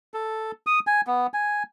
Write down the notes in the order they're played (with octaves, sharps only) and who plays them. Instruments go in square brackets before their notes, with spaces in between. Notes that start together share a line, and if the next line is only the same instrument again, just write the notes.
[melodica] A4
D#6
G#5
B3
G#5